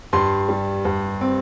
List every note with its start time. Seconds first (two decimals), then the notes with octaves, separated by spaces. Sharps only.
0.13 G2 C6
0.49 G3
0.85 G2
1.21 C4